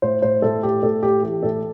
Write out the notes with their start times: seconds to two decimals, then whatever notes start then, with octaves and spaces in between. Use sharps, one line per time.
0.02 A2 C5
0.22 A2 C5
0.42 A2 A4
0.63 A2 G4
0.82 A2 A4
1.02 A2 G4
1.23 E3 G4
1.43 A2 A4